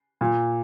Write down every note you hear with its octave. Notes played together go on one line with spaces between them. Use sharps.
A#2